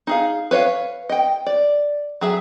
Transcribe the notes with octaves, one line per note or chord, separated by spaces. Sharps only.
D#4 G#4 F5
B4 C#5 D#5 F5
D#5 G5
D5
F#3 G#4 E5